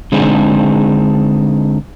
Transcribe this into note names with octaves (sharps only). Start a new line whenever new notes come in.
D3 G#3 C4 D4 D#4 G#4